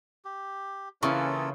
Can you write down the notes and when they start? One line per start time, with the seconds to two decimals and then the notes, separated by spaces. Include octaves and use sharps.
0.25 G4
1.03 C#3 E3 A#3 C#4 E4 F4 A4 C#6